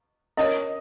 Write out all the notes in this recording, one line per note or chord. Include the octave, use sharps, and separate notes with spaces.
C#4 A#4 C#5 D#5